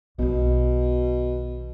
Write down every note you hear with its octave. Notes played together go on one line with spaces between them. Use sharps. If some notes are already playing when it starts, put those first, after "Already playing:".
B1 B2 D#3